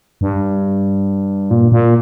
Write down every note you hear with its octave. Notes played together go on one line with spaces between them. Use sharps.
G2
A#2
A#2